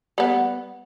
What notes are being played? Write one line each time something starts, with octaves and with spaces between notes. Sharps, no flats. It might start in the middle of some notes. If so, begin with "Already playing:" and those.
G3 B3